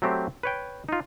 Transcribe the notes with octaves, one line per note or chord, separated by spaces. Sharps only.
F#3 A3 C4 G4 C5
B4 C#5 G5
D#4 F4